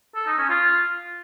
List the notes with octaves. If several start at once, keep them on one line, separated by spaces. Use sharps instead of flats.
A4
D#4
C#4
F4